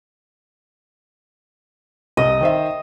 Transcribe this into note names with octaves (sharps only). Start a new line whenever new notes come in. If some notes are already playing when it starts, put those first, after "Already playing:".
C2 D#5
D#3 C5 E5